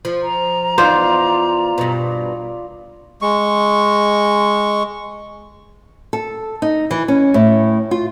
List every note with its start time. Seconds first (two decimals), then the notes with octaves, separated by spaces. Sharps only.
0.05 F3
0.23 A#5
0.78 E2 B3 D#4 F4 C5 D5
1.78 G2 B2
3.22 G#3 C#6
6.13 A4
6.62 D#4
6.91 E3
7.08 C#4
7.34 A2
7.91 F4